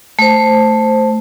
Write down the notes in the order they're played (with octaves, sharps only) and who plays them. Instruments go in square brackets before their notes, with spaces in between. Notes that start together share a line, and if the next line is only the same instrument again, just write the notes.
[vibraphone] A3 C5